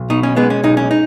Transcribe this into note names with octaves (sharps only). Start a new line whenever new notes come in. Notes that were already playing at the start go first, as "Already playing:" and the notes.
Already playing: B1
B2 D#4
C#4
G#3 B3
C#4
B1 D#4
C#4
D#4